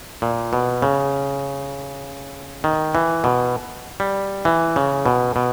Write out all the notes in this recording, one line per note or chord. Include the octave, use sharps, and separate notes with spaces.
A#2
B2
C#3
D#3
E3
B2
G3
E3
C#3
B2
B2